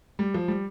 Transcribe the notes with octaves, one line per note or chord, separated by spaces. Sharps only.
G3
F3
G3